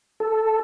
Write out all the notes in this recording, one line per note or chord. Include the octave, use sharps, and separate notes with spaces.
A4